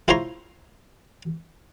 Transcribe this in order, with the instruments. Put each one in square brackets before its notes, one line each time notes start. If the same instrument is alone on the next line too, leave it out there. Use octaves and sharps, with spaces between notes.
[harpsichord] E4 F4 C5 C#5 A#5 C6